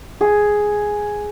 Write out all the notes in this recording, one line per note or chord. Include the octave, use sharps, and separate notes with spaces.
G#4